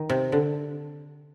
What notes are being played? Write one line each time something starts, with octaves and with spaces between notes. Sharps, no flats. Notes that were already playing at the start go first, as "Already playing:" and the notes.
Already playing: D#3
C3
D3